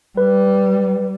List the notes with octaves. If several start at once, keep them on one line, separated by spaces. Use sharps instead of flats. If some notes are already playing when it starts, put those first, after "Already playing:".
G3 B4